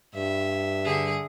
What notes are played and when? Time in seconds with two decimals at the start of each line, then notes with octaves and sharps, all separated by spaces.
0.15 G2 E5
0.84 D3 G#4